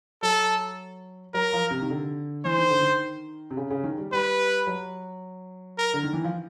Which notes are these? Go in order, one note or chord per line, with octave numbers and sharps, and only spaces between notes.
F#3 A4
F#3 A#4
F3
C3
D#3
D3
E3 C5
D#3
D3
D#3
C3
C#3
C#3
D#3
G3
G3 B4
F#3
A#4
D3
D#3
E3
F3